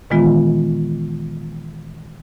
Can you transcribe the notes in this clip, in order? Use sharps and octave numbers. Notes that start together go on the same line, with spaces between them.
A#2 D#3 E3 G#3 B3 F4